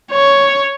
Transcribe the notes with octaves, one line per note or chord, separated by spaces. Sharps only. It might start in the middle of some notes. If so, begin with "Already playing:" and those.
C#5